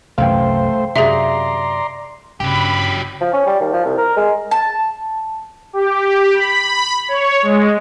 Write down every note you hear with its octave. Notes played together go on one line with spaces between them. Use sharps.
C2 F#2 E3 A3 C5 F5 G5
F#2 C3 G#4 D5 E5 A#5 C6
G1 G2 C#3 F#3 G4 B5
F3
C#4
G3
D#2
F3
C2
A#4
G#3
A5
G4
B5
C#5
G#3